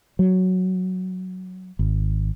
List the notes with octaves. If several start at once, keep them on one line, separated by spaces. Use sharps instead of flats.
F#3
G#1